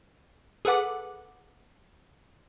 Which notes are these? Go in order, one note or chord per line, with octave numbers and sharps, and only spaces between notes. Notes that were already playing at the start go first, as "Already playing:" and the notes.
G#4 A4 B4 F#5 D6